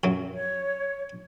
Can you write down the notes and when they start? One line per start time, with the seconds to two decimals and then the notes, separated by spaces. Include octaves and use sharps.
0.04 F#2 F#3
0.32 C#5